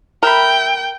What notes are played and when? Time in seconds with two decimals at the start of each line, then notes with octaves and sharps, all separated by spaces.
0.23 A#4 E5 G5 B5